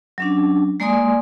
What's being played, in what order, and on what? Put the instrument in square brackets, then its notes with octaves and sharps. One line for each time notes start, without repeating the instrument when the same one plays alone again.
[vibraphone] F#3 C#4 D4
G#3 A#3 D5 G#5 C6 D#6